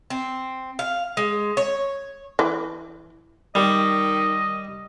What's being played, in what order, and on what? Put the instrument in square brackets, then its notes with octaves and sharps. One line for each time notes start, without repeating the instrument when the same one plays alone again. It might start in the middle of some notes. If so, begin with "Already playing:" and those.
[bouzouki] C4
F5
G#3
C#5
[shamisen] E3
[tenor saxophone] D#3 [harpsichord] G3 [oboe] D#5